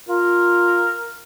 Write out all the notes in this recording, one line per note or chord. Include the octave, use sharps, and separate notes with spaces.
F4 A#4